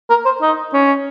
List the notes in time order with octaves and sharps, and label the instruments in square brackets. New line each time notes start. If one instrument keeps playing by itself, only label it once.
[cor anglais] A#4
C5
D#4
C#4